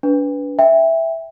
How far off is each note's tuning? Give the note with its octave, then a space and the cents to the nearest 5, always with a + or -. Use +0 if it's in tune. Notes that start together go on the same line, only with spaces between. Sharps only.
D4 -35 B4 +0
E5 +0 G5 +25